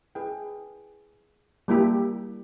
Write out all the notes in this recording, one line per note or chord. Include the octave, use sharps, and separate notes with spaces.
E4 G#4 B4 G5
G3 A#3 E4 G4